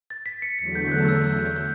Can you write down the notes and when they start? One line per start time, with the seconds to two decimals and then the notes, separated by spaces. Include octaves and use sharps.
0.10 A6
0.26 B6
0.42 C#7
0.59 E2 D3 F#3 A3 B6
0.75 G6
0.91 F#6
1.08 E6
1.24 G6
1.56 G6